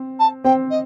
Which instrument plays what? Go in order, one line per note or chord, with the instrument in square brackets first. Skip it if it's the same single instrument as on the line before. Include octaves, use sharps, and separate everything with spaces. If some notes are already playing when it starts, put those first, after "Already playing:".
Already playing: [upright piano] C4
[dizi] A5
[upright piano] C4 [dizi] G5
[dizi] D#5